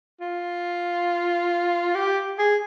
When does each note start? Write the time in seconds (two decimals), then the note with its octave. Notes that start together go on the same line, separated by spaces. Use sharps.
0.21 F4
1.95 G4
2.39 G#4